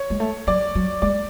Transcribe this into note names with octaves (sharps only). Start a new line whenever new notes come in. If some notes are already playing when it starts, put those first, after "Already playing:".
Already playing: C#5
G#3
A3
F#3 D5
F#3
G#3 D5